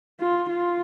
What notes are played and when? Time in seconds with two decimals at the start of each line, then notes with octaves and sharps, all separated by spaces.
0.20 F4
0.49 F4